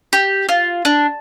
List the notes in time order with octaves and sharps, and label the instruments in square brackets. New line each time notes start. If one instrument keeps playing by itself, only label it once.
[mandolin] G4
F4
D4